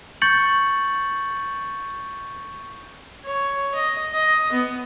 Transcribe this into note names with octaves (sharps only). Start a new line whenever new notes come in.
C#6 G6 A6 C#7 F#7
C#5
D#5
D#5
B3